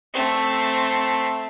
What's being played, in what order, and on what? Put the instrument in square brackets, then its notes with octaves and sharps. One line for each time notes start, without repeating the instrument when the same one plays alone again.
[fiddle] A3 C4